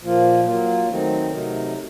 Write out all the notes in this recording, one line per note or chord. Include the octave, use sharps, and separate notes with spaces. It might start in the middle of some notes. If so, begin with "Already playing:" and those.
A#2 F3 A#3 F4
F#3 A#3 F4
D#3 F#3 A3 C4 D#4
C3 F#3 A3 D#4 A#4